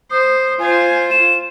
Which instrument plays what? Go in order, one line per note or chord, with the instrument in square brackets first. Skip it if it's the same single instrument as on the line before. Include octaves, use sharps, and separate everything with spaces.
[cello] C5 [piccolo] D#6
[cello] F4 C5 [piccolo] G#5
[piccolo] E7